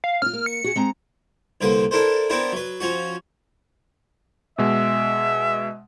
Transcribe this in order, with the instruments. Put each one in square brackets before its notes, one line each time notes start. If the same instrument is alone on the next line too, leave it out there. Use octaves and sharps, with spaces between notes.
[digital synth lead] F5
[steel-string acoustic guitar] C#4 F4 [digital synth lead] F6
[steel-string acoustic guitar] A#3
[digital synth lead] C#7
[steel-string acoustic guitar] F#4 G#4
G#3 C4 A#5
[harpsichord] C2 D3 A#3 B4 C5
D4 E4 A4 A#4 C5
B3 C4 D4 E4 G4 A#4
F#3 B4
F3 C#4 F#4
[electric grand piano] B2 G#3 [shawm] E5